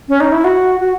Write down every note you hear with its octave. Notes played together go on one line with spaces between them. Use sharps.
C#4
D#4
E4
F#4
F#4